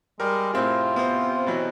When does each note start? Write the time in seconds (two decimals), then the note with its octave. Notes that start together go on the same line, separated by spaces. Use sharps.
0.20 G3 G#3 A#4
0.54 A2 C3 C4 F4 G#4
0.96 B3 C5
1.46 B2 E3 F#3